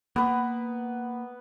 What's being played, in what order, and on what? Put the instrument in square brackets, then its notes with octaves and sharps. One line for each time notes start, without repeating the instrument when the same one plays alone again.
[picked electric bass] A#3 [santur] B3 B4